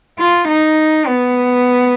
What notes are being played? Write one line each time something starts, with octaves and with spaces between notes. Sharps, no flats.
F4
D#4
B3